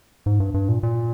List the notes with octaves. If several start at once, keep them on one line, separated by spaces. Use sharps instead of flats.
G#2
G2
G2
A#2
A#2